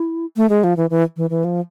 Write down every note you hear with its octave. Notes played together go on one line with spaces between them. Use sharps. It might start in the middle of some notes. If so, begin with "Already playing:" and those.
Already playing: E4
A3
G#3
F3
E3
E3
E3
E3
F3